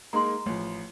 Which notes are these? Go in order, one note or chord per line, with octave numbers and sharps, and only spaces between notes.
G#3 A#3 D#4 A#5 C6
A1 F3